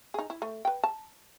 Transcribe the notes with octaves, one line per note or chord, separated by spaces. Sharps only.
D#4 G#4
E4
A3
B4 G5
A5